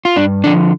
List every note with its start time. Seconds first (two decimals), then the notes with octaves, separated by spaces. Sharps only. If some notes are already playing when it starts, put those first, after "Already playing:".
0.05 F4
0.16 G2 D4
0.44 D3 F3 D4